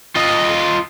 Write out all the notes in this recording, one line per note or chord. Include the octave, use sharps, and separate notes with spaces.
F4 D#5